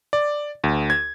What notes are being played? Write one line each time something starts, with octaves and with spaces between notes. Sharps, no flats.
D5
D2
G#6